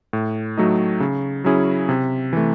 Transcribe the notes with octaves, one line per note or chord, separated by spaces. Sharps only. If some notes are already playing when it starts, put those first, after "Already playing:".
A2
F#3 A3 D#4
C#3
F#3 C#4 E4 G#4
C3
E3 A3